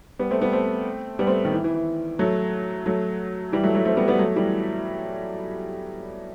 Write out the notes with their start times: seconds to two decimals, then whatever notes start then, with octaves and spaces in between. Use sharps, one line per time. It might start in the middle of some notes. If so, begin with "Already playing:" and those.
0.19 G3 B3
0.31 A3 C4
0.41 G3 B3
0.53 A3 C4
1.19 G3 B3
1.27 A3 C4
1.45 D#3
1.53 E3
1.64 E3
1.75 E3
2.19 F#3 A3
2.86 F#3 A3
3.52 E3 G3
3.64 F#3 A3
3.75 F#3 A3
3.85 A3 C4
3.97 G3 B3
4.08 G3 B3
4.19 F#3 A3
4.36 E3 G3